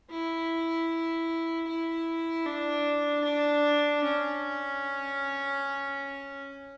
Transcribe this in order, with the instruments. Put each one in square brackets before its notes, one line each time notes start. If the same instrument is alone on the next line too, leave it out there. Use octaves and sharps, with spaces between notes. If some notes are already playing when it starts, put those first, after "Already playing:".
[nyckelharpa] E4
E4
D4
D4
C#4